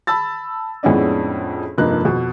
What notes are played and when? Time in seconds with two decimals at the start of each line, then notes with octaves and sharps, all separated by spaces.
0.07 A5 B5 E6 A6
0.83 F2 A2 G#3 B3 C#4 D4
1.78 F1 G2 F3 A#3 D#4 F#6
2.05 F2 B2